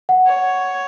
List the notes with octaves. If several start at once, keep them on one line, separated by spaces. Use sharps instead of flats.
F#5
C#5